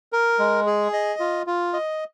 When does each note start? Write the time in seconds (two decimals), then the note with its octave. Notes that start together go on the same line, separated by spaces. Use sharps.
0.13 A#4
0.39 G#3
0.66 G#4
0.93 D#5
1.20 F4
1.47 F4
1.73 D#5